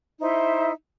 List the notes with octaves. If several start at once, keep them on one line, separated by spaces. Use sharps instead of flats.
D#4 E4 C5 E5